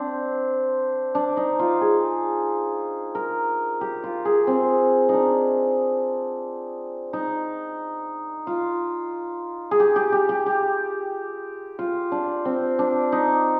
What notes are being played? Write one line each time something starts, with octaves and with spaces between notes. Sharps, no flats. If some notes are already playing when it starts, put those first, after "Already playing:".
Already playing: C4 D4
D4
D#4
F4
G#4
A#4
G4
F4
G#4
C4
D4 D#4
D#4
F4
G#4
G4
G4
G4
G4
G4
F4
D4
C4
D4
D#4